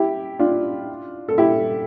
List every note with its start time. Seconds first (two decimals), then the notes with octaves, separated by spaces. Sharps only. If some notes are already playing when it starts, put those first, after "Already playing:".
Already playing: E4 G4
0.39 D4 F4
1.28 A4
1.38 E4 G4